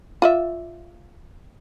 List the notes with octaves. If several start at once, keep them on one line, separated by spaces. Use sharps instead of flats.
F4 D5 E5